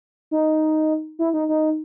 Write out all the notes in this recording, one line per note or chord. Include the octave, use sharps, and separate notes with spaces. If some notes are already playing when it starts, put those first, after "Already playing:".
D#4
E4
D#4
D#4